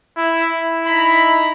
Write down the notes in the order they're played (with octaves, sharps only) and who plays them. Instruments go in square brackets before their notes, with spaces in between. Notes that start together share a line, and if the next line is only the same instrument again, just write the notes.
[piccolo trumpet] E4
E4
[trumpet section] D#4 A#5 B5